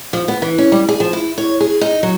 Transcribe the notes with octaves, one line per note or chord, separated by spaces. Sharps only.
F3
B3
E3
C#4
G3
G#4
F3
E4
C#5
G#4
D#4
F#3